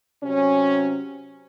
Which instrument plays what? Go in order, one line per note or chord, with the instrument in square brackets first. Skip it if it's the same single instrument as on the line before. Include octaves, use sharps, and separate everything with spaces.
[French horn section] C3 F#3 C#4